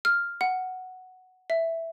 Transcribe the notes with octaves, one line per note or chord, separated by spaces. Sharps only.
F6
F#5
E5